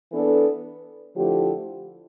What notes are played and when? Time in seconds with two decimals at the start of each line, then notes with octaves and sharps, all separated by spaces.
0.11 E3 B3 D4 A4
1.15 D3 F3 A3 E4 G4